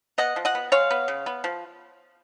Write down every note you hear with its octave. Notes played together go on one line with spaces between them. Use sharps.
B3 D#5 F#5
F3
D#5 F#5
B3
G#3 C#5 F5
B3
C#3
B3
F3